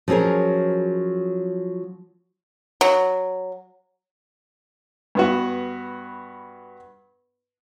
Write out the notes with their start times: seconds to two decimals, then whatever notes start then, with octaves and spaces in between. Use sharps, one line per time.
0.08 F3 F#3 C#4 G#4 A#4
2.81 F#3
5.15 G2 B3 F#4